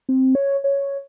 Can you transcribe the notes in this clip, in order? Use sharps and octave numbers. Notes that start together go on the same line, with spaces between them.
C4
C#5
C#5